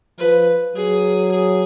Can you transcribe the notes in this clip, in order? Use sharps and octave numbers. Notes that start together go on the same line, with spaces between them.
F3 B4
F#3 G#4
G#4